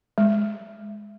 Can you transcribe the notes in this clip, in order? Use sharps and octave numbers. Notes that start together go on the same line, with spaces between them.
G#3